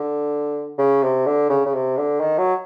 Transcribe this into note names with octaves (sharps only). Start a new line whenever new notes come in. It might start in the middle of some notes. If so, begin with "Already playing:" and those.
Already playing: D3
C#3
C3
D3
C#3
C#3
C3
D3
D#3
F#3